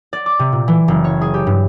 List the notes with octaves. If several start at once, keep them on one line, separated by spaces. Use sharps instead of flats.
D5
D6
C3
A#2
E3
F#1
C#5
G#4
G4
G2